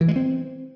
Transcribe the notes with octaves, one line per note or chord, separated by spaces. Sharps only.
E3
G#3
C4